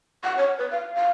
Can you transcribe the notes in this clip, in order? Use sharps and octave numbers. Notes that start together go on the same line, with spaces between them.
F#5
C#5
B4
F5
F5